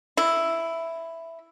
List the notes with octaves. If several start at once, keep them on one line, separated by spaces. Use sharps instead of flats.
E4